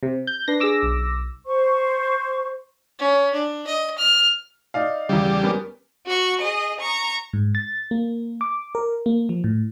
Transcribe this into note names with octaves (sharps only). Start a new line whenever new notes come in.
C3
G6
D4 B4 A#6 C7
D4 G#4 D6 E6 A#6
B1
C5 C#6
C#4
D4
D#5
F6
D#4 D5 F5
E2 C#3 G3
B3 C#4 A#4
F#4 C#6
G#4 D#5
A#5 C#6
G#2
A6
A#3
D6
A#4
A#3
F3
A2